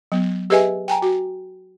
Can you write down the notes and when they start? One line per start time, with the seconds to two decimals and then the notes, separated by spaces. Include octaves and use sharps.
0.12 F#3 B3
0.50 G4 G#4 B4 D#5 E5 G#5
0.88 G5 G#5 A#5
1.02 F#4